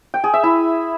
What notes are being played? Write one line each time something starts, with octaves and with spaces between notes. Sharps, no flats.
G5
G#4
E5
E4